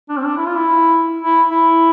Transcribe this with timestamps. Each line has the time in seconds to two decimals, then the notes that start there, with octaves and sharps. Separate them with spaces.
0.09 D4
0.17 C4
0.24 D4
0.37 E4
0.47 F4
0.56 E4
1.22 E4
1.50 E4